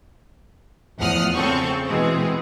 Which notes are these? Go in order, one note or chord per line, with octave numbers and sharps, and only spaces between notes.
E2 A2 F3 F#5 D#6 F6
C#3 C4 A4 C#6
B2 E3 G#3 C4 G#4